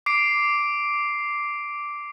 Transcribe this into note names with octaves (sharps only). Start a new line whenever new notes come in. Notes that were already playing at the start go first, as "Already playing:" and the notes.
D6 C7 D7